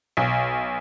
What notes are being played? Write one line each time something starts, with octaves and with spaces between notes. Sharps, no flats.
B1